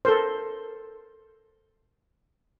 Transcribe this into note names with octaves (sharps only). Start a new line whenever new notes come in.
A4 A#4 C5